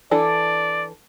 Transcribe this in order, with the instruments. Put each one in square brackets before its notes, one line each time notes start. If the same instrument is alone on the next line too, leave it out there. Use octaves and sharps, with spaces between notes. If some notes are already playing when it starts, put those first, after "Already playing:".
[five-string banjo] E3 D4 A4 [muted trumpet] D5